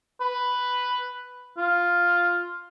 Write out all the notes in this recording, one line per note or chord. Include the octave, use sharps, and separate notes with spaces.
B4
F4